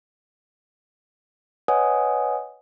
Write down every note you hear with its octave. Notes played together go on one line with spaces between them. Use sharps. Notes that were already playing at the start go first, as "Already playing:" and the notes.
B4 C#5 D#5 F#5 G#5 D#6